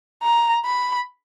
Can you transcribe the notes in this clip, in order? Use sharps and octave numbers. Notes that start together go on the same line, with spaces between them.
A#5
B5